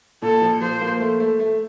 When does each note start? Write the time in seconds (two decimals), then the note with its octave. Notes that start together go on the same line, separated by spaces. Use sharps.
0.22 A#2 A4
0.42 F3
0.61 F3 C5
0.81 A#3
1.00 A3
1.20 A3
1.40 A3